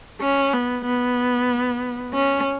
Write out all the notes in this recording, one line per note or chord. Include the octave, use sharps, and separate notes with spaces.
C#4
B3
B3
C#4